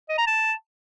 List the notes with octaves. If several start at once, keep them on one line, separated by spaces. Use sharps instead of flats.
D#5
A#5
A5